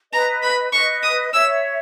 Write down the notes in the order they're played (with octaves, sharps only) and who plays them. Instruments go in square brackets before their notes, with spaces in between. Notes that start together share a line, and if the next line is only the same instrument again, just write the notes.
[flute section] B4 D#5 [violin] A#5
[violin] B5
[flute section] B4 D#5 [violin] C#6
[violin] D#6
[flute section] C#5 E5 [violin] E6